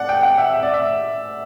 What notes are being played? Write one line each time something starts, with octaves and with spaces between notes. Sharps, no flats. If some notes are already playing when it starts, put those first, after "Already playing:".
Already playing: D5 F#5
G5
F#5
E5
E5
D5
E5